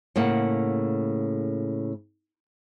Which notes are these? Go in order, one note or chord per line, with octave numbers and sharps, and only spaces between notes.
A2 C#3 A#3 F#5